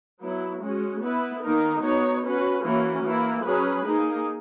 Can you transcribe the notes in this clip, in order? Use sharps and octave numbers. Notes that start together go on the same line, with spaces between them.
F#3 B3 E4
G#3 C#4 F#4
B3 E4 B4
D#3 A#3 D#4 A#4
B3 D#4 F#4 C#5
C#4 F#4 B4
E3 A#3 C#4 F#4
E3 A#3 E4
F#3 C#4 G#4 B4
A#3 D#4 G#4